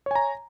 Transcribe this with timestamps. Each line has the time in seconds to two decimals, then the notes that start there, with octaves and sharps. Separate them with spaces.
0.06 C#5
0.11 G#5
0.15 A#5